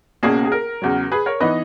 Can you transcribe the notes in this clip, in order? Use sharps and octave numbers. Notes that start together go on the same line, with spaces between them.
C#2 B2 A#3 C#4 G#4
G#4
A#4
E2 C#3 F#3
G#4 B4
A#4 C#5
E3 B3 D#4 B4 D#5